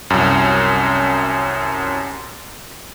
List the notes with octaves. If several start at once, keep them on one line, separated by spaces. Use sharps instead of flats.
C2 F#2